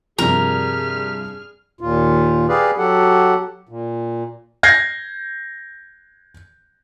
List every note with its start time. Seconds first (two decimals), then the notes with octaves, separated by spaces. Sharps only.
0.18 G2 C3 F3 G4 G#4 A#4 F6
1.81 D#2 A#2 F4
2.48 G4 G#4 B4 D5 F5
2.78 F#3 G4 A4 F#5
3.69 A#2
4.63 G6 G#6 A#6 C7